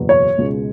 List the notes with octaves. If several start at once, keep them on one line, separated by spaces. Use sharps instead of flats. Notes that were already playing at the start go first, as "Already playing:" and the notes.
Already playing: F#1 E2 B2 F#3 B3
C#5
C#2 B2 G#3